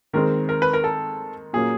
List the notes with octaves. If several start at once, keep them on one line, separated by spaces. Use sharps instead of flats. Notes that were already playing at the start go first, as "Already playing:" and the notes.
D#3 G#3 C4 A#4
A#4
B4
A#4
A4
A#2 F#3 A#3 C#4 G#4